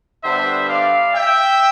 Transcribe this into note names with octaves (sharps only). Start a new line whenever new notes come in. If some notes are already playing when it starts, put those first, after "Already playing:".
D3 G3 B3 D4 C5 E5
D5 F5
E5 G5